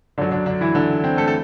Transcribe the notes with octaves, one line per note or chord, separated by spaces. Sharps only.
F#2 D3 F#3 D4
D3 D4
D3 D4
E3 E4
D3 D4
C4
A3 A4
A4